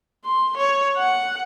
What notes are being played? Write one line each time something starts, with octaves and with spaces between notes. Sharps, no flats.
C6
C#5
F#5